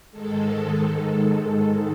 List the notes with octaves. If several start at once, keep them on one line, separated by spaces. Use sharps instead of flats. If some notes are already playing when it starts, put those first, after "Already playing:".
G#2 D#3 G#3 A4